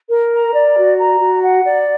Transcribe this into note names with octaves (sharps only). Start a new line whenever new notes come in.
A#4
A#5
D5
F#4
A#5
F#4
F#5
D5